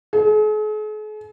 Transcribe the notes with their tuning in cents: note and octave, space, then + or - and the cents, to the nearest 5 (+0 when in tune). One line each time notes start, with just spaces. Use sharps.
G#4 +45